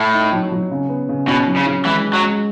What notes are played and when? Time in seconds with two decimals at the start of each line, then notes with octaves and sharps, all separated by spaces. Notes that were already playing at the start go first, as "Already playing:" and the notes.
Already playing: A2
0.14 D#4
0.33 F#3
0.52 F#3
0.71 C#3
0.89 B3
1.09 C#3
1.28 B2 C#4
1.47 F#3
1.57 C#3
1.66 F#3
1.85 E3 G#3
2.04 G#3
2.13 F#3
2.23 G#3